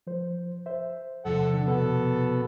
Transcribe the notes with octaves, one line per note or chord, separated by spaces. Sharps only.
F3 C5
C5 E5
E2 C3 F3 A4 F#5
D3
B2 B3 A4